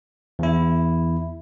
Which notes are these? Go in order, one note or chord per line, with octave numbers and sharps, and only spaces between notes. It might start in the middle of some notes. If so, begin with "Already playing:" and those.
E2 E4